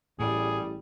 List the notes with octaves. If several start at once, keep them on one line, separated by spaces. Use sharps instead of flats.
A1 A2 G3 G#4